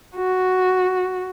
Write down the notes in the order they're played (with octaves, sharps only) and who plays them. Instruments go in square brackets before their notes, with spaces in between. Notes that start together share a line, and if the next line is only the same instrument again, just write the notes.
[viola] F#4